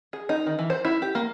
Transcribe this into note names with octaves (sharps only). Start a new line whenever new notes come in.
G#4
D#4
D#3
E3
C5
E4
G4
A#3